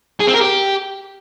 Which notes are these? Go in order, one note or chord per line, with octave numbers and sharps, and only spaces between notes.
G#4
C4
A#4
G4